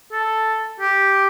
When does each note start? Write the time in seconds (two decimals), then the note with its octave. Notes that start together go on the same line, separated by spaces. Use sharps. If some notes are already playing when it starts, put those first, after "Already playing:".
0.12 A4
0.80 G4